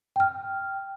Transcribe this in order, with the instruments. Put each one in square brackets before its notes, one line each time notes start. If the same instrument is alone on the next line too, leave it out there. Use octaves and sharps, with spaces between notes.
[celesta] G5 F6